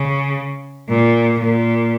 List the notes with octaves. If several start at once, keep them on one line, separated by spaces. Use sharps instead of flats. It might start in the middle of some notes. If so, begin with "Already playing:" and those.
Already playing: C#3
A#2
A#2